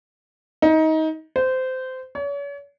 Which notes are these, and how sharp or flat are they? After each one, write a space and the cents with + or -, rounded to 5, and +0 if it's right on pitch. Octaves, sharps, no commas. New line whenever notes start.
D#4 +25
C5 -20
C#5 +40